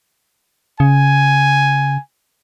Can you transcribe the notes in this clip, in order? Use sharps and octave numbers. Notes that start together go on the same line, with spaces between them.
C#3 G#5